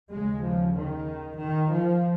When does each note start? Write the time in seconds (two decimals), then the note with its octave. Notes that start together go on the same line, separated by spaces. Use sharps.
0.12 D#2 C#3 G#3
0.45 F3
0.77 D#3
1.41 D#3
1.75 F3